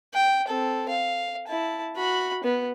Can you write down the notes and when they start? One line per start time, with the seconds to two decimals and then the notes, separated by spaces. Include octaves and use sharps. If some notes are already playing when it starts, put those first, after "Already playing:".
0.14 G5
0.48 C4 A4
0.89 F5
1.48 E4 A5
1.95 F#4 B5
2.44 B3